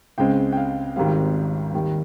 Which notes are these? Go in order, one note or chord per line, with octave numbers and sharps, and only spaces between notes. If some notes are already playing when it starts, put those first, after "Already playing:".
C#2 C#3 G#3 C4 G5
G5
F5
G#1 G#2 D#3 G3 C4 F5
D#2 D#3 G3